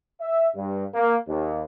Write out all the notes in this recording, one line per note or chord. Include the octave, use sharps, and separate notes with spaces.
E5
G2
A#3
D#2